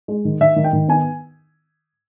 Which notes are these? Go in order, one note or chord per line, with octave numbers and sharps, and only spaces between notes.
G#3
D#3
D#3 E5
D#3
G5
D#3
B3 G#5